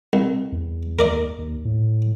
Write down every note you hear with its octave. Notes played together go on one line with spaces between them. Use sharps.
C2
E2
D#2 A#4 D5 D#5
D#2
A2